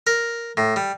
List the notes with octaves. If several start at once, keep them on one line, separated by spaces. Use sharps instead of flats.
A#4
A2
G3